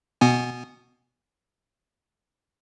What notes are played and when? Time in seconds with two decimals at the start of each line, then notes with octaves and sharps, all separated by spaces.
0.21 B2 B3 G#5